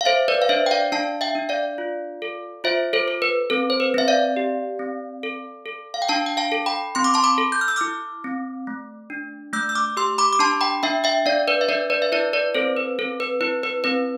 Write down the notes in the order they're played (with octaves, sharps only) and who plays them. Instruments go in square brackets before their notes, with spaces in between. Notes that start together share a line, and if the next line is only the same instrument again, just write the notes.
[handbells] F5
A4 C5 E5
B4 D5
F5
D4 C5 E5
G5
D5 F5
D4 F5 A5
E5 G5
D4
D5 F5
F4
A4
F4 C5 E5
A4 C5
A4
B4
C4 A4
C5
B4
C4 E5
D5 F5
G4
C4
A4
A4
F5
G5
D4 F5 A5
G5
F5 A5
A4
G5 B5
C4 C6
D6
A5 C6
B5 D6
A4
G6
F6
E6
E4 D6 F6
C4
A3
D4
A3 E6 G6
E6
D6 F6
G4 C6 E6
B5 D6
D6
D4 A5 C6
G5 B5
D4 E5 G5
E5 G5
D4 D5 F5
B4 D5
E5
D4 B4 D5
B4 D5
E5
E4 B4 D5
B4 D5
C4 A4 C5
B4
C4 A4
B4
E4 B4
B4
C4 B4